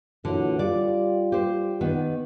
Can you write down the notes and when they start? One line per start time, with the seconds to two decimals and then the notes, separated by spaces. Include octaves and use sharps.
0.25 A#2 D3 E3 F#3
0.59 G3 F4 D5
1.32 G4 C5
1.81 D#3 B3